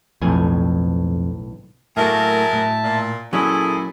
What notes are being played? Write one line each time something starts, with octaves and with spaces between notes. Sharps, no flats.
B1 F2 A2 G#5
A2 F#3 A3 A#3 G#4 A#4 E5 A5
A2
A#2
A#2 F#3 C#4 E4 G#4 A4 G#5